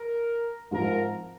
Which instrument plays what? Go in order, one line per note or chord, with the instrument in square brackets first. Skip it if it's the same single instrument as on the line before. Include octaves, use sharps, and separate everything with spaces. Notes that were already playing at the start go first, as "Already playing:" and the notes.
Already playing: [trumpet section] A#4
[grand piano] G#2 F3 C4 F4 [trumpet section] A#4